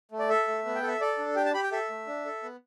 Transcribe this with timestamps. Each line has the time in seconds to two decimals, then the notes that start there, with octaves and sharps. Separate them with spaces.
0.12 A3
0.19 D5
0.29 A4 E5
0.48 A3
0.65 B3
0.75 G5
0.82 A4
0.88 E5
1.01 A4 D5
1.18 D4
1.36 G4 G5
1.45 A5
1.54 G4 B5
1.63 G5
1.72 A4 E5
1.90 A3
2.07 D4
2.25 A4
2.43 B3